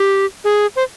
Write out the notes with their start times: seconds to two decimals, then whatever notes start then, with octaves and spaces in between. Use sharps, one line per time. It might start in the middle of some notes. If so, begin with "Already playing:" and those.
Already playing: G4
0.44 G#4
0.76 C5